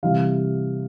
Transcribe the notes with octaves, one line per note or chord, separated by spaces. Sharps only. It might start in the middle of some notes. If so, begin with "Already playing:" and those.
C3 E3 G3 F5